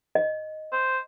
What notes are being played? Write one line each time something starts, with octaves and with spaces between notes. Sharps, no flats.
D#5
C5